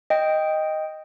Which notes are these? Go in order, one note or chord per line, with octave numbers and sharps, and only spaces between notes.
D#5 G5